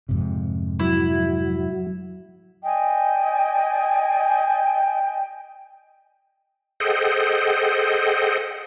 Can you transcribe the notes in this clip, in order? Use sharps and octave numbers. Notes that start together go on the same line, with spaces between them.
F2 G#2 C3
F#3 E4
D5 D#5 G5 G#5
G#4 A4 C5 D#5 F#5 G5